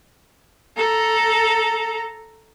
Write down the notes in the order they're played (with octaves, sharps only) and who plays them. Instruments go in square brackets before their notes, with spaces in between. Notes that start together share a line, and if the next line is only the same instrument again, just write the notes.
[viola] A4 A#5